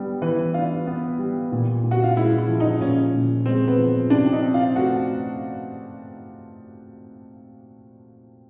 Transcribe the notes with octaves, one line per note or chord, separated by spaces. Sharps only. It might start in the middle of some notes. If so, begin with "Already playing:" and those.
Already playing: G3 B3 D4
E3 B4
D4 F4
B3
G3
A#2
A#2
F#4
F4
G#3 E4
E4
F3
D#4
A#2 C#4
A#2
G#3 C4
B3
F3
C3 D4
D#4
C4
F4
A3 F#4